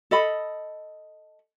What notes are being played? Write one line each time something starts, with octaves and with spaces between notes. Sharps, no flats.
A4 D#5 B5